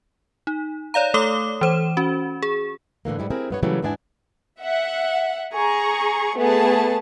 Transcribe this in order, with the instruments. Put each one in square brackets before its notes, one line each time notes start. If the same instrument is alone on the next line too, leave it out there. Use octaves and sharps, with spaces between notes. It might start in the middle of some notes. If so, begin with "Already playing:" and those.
[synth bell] D#4
C#5 D5 F5 A#5
A3 A4 C#5 D6 D#6 G7
E3 C5 E7
C#4 F#4
G#4
[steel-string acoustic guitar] A2 D3 E3 A#3
G#2 G3 E4
C4 E4 G#4 A#4
G2 B3 C#5
A#2 C#3 E3 F#3 G3 A3
E2 G#2 B3 D4 E4 G#5
[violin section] E5 F#5
G#4 A#5 C#6
A3 B3 G#4 A5